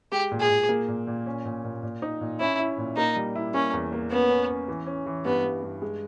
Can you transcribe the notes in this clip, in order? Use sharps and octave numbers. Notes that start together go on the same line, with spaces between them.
G#3 G4
A#2
G#4
A#2
A#3
A#2
A#2
C#4
A#2
A#2
A#2
D#4
A#2
C#4 E4
E4
A#2
A#3 D#4
G3
E4
A#3 C#4
E2
A#3
B3 C#4
C#4
C#4
E3
C#4
E3
G2 B3
G2
G2
G#3